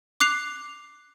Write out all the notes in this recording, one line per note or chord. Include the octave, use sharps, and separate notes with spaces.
D6 F#6 C7 F7